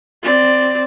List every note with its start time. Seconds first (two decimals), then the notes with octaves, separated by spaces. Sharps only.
0.23 C4 D5